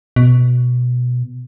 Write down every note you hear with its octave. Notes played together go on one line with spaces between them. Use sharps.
B2